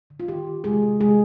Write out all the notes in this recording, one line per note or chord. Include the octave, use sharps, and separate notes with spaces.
D3
F4
D#3 G4
D#3
C3 G#3 G#4
C3
C3 G#3 G#4